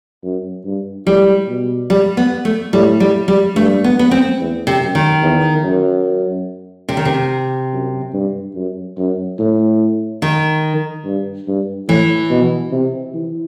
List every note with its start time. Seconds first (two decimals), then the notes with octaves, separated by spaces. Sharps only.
0.23 F#2
0.64 G2
1.06 A2 G3
1.48 B2
1.90 G3
2.17 B3
2.45 A3
2.73 A2 G3
3.00 G3
3.28 G3
3.56 G2 A3
3.84 B3
3.99 B3
4.11 C4
4.40 E2
4.67 C3
4.80 F#2
4.95 D#3
5.23 E2
5.64 F#2
6.89 C3
6.97 D#3
7.05 C3
7.73 F#2
8.13 G2
8.55 F#2
8.98 F#2
9.39 A2
10.22 D#3
11.05 G2
11.48 G2
11.89 A2 E3
12.30 B2
12.71 C3
13.14 E3